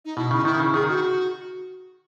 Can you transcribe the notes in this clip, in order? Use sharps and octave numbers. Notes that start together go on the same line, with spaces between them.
D#4
B2 E4
C#3 D#4
D#3 E4
C#3
D#3 G#4
D#3
F#4